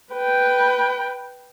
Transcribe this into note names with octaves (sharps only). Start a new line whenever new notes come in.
B4 G5